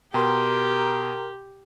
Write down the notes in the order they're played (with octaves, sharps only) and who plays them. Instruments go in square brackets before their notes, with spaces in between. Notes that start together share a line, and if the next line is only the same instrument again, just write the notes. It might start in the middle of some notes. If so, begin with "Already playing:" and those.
[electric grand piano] B2 [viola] G4 [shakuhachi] A#4 [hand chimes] G5 A#5 C6